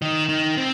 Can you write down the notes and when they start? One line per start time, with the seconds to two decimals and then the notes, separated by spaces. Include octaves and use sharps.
0.02 D#3
0.29 D#3
0.57 C4